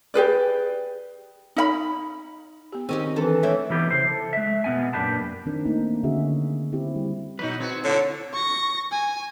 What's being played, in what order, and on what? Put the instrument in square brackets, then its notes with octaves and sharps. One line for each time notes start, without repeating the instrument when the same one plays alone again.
[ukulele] G4 G#4 B4 D5
D#4 E5 B5
[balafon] B3 G4
[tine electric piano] D#3 C4 [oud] C#4 D#4 G4 [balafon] G#4
[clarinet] E3 [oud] G#3 A4 [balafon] D4
[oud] E2 A3 E4 [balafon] B4 C#5 E5
[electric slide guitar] E3 B3 D#4 G4
C#3 E4 C5
A4
G#3 E5
B2 B3 G#5
F#2 A#2 D4 G4 B4 A5
[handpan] D#3 C4 D4 A#4
A3 A#3 D#4
D3 C#4 F#4 G#4 E5
C4 E4 G4
G3
[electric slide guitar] B2 B4 [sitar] F#3 D#4
[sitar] B3 F#4 [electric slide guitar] C4 G#4
[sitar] A2 E4 [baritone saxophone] D3 [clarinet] C#5
[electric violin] C#6 A#6
G#5